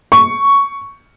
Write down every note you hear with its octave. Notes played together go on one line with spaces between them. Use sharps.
C#6